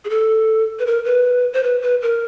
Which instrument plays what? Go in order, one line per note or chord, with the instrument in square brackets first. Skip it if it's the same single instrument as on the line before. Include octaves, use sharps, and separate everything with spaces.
[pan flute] G#4
A4
B4
A#4
B4
C5
B4
B4
A#4